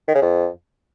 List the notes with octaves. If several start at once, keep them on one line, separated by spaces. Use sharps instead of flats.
D#3
C#3
F2